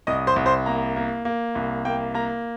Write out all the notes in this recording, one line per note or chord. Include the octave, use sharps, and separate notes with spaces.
C2 D#5 D#6
C5 C6
C2
C5 C6
A#3 A#5
A#3
A#3
C2
A#3 G5
A#3 A#5